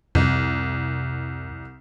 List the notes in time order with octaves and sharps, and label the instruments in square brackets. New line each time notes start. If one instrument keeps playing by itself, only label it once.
[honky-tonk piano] C2 [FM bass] F2